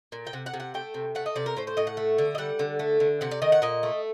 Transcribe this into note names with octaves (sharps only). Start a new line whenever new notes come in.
A#2
G5
C3 F#5
F#5
C3
F#5
A3 G5
C3
A3 F#5
D#5
C3 D5
A#4
A2 C5
C5
A2 D#5
F#5
A3
D3
D#5
G3 F#5
D3
A3
D3
C3 F#5
D5
D#3 D#5
F#5
A#2 D#5
A3